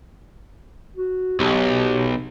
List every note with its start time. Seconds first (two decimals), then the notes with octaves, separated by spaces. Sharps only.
0.97 F#4
1.40 B1 G4